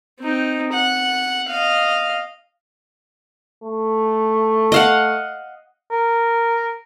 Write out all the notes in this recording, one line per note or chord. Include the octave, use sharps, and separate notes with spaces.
C4 D#4
F#5
D#5 F5
A3
D#5 F5 F#5
A#4